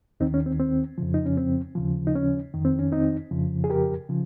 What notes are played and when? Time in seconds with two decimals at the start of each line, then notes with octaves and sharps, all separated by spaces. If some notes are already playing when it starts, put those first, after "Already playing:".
0.20 D#2 D#3 C4 D#4
0.34 C#4
0.46 C4
0.60 C4
0.98 F2 C#3 F3
1.14 D#4
1.26 C#4
1.37 C4
1.75 D#2 C#3 F3
2.07 D#4
2.15 C#4
2.54 F2 D#3
2.65 C4
2.79 C#4
2.92 C4 D#4
3.31 F2 C#3 F3
3.64 G#4
3.70 G4 A#4
4.09 C#3 F3